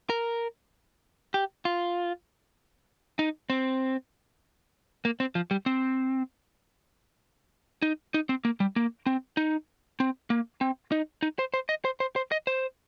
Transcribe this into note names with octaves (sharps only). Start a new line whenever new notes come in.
A#4
G4
F4
D#4
C4
A#3
C4
F3
G3
C4
D#4
D#4
C4
A#3
G3
A#3
C4
D#4
C4
A#3
C4
D#4
D#4
C5
C5
D#5
C5
C5
C5
D#5
C5